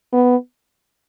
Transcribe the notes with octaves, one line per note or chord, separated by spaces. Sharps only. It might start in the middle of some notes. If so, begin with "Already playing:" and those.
B3